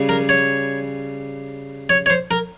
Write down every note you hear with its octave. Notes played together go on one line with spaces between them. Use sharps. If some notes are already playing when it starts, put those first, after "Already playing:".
Already playing: C#3 G3 C#4
A#4
C#5
C#5
C#5
C5
A#4